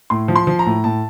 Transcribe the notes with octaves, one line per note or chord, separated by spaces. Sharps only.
A2 C6
F3
C6
F3
A#5
A2
A2 A5